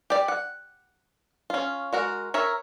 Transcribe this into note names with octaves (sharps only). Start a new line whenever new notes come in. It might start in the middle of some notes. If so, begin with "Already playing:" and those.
G4 D5
F#5
C#4 F4
G#3 F#4 A#4
A#4 C#5 E5